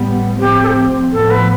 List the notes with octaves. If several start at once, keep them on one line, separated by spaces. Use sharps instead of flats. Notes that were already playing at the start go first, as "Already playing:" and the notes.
Already playing: A2 G3 B3
A2 F3 C4 G4
A4
G4
A2 F3 B3 A4
B4